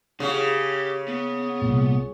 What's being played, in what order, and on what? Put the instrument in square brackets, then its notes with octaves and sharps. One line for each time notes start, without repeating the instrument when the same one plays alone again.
[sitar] C#3 [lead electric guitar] G4 F#5
[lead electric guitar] B3
[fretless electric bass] C2 A#2